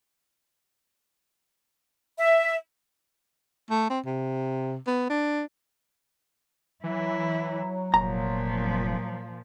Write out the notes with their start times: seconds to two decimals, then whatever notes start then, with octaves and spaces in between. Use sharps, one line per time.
2.18 E5
3.71 A3
3.90 C4
4.06 C3
4.87 B3
5.10 D4
6.84 E3 F#3 E4
7.94 F1 A#2 F3 A#5